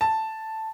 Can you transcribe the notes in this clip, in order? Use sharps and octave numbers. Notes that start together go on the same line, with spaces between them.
A5